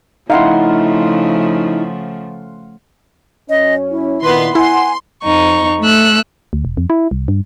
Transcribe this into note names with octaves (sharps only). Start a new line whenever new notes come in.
C#3 F3 A3 D#4 E4 F5 F#5 C6
F#2 C#4 D#5
E4
A#2 D#3 B3 B4 C6
E4 F#5 G#5 C6
F2 D#4 C#6
A3 E6 F#6
D2
E1
F2
E4
C2
G2